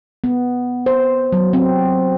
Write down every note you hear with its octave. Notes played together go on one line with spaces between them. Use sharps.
B3
C5
F#3
C4